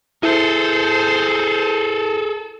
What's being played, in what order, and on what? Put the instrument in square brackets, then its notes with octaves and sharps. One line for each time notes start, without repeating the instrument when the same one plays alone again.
[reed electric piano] E4 [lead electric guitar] G#4 A4 [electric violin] C5